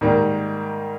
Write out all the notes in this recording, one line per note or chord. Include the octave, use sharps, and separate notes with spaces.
G#2 D#3 G3 A#3